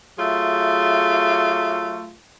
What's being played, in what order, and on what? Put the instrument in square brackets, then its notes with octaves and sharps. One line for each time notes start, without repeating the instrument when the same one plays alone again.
[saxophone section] F#3 A3 F4 G#4 E5